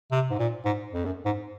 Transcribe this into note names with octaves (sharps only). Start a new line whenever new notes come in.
C3
G#2
A#2
G#2
F2
F#2
G#2